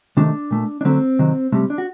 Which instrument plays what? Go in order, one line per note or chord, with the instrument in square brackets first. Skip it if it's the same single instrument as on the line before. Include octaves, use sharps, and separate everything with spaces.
[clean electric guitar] C3 D#3 F#3 A3 D4
A#2 A3
D4
D3 F#3 A3 C4
C3 D#3 F#3
C3 G3 A3
D4
F#4